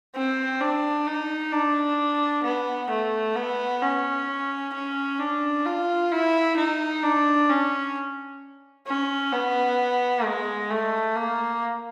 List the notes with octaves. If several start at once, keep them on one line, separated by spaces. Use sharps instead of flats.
C4
D4
D#4
D4
B3
A3
B3
C#4
C#4
D4
F4
E4
D#4
D4
C#4
C#4
B3
G#3
A3
A#3